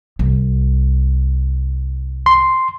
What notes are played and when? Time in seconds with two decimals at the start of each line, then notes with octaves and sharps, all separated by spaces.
0.19 C2
2.26 C6